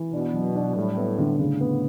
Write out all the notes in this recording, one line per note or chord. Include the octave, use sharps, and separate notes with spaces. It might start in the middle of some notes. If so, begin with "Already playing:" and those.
Already playing: E3
B2 D4
F#3
D4
A2 G3
B3
D3
A2 C#3
B3